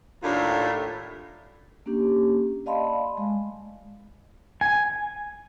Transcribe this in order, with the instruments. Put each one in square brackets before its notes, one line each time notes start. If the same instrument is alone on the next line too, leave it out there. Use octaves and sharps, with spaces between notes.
[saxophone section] D#2 A2 D4 F4
[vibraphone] A#3 C#4 D4 G4
D5 D#5 F5 A5 B5 C6
G#3
[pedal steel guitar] G#5